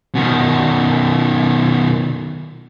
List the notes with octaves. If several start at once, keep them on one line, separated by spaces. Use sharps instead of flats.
B2 D#3